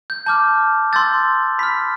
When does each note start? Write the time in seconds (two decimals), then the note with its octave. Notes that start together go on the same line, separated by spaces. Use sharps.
0.10 G6
0.26 A5 D6 F6 G6
0.93 C6 E6 G6 A6
1.59 B5 F6 B6